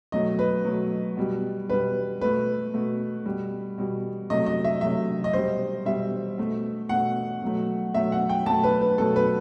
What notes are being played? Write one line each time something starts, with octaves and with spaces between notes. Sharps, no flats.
B2 F#3 A3 D#5
B4
B2 F#3 A3
B2 G3
B2 G3 B4
B2 A3 B4
B2 A3
B2 G3
B2 G3
C3 F#3 A3 D#5
D#5
E5
C3 F#3 A3 E5
D#5
B2 G3 C5
B2 G3 E5
B2 A3
B2 A3 F#5
B2 F#3 A3
B2 F#3 A3 E5
F#5
G5
B2 F#3 A3 A5
B4
B4
B2 F#3 A3 A4
B4